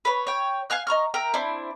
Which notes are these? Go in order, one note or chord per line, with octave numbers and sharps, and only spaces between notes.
B4 C#5
C#5 G5
F5 G#5 F6 F#6
D#5 A#5 C#6 F6
A#4 E5 G5 A#5
C4 D4 E4